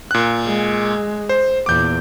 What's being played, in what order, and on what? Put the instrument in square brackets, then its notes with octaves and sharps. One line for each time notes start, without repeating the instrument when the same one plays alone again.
[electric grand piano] A#2 F#6
[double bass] G#3
[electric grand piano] C5
[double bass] E2 A#2 [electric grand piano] D6 G6